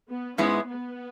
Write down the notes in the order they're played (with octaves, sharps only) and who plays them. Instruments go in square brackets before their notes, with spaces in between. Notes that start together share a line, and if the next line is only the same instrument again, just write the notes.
[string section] B3
[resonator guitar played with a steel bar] G#2 G#3 B3 E4 [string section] C#4
[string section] B3